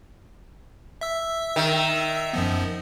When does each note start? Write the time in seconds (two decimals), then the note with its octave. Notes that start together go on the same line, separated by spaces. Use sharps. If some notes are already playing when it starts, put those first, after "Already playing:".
1.01 E5 E6
1.56 D#3
2.33 F#2 F3 B3